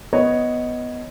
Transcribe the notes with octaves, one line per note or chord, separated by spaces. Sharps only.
B3 B4 C#5 D#5